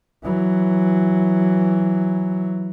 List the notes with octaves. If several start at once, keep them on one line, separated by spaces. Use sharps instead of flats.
E3 F#3